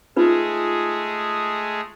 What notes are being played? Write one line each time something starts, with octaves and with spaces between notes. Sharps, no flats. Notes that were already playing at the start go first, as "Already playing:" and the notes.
G#3 A3 D#4 F4 G#4 B4